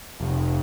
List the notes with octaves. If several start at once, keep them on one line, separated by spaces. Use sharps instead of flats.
F1